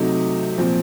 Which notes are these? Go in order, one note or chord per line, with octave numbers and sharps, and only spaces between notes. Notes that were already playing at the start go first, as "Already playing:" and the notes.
Already playing: C3 F#3 A3 D#4
A#2 F3 C4